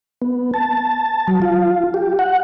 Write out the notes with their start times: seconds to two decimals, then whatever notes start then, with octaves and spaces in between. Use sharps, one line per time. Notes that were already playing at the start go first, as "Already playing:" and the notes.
0.22 B3
0.54 A5
1.28 F#3
1.42 F4
1.94 G4
2.19 F#5